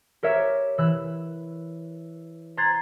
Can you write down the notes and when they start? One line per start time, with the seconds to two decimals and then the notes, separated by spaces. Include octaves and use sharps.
0.23 G4 A#4 C#5 E5
0.78 E3 E6 F#6
2.57 A#5 C6 F#6 G#6 A6 C7